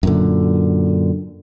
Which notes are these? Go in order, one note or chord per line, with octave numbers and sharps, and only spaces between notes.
F#2 A#2 D3